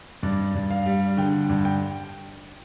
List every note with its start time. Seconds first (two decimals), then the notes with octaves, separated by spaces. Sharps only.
0.23 G2 D5
0.55 G2
0.71 F5
0.86 G3
1.17 D3 G5
1.49 G2
1.65 G5